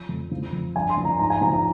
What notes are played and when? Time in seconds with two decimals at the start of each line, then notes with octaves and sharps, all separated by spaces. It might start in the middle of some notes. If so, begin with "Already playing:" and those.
Already playing: F3
0.09 F2
0.31 F3
0.53 F2
0.75 G2 G#5
0.90 C6
0.98 F3
1.05 A#5
1.19 G#2 A#5
1.30 G#5
1.41 F3 A#5
1.53 A#5